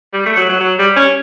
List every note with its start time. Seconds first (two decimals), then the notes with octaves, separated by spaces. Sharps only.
0.13 G3
0.26 A3
0.37 F#3
0.49 F#3
0.60 F#3
0.79 G3
0.96 C#4